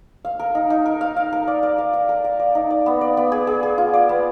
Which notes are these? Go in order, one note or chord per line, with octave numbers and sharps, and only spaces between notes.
F5
A#4
D#4
D#4
A#4
F5
F5
A#4
D5
D5
F5
F5
A#4
F5
D5
D#4
D5
B3
D5
B3
G#4
G#4
G#4
F4
D5
B3